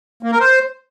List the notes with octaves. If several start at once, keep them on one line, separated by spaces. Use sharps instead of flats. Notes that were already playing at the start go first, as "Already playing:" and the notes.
A#3
A#4
C5